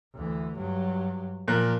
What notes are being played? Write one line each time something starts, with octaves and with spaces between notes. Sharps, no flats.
D2 E3
G2 F#3
A#2 F3 A#4 F#6